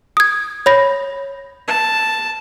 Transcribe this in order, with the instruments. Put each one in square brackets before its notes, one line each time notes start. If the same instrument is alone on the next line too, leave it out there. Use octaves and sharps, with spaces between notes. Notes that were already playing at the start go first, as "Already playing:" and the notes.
[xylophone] D#6 G#6
C#5 B5 A#6
[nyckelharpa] A5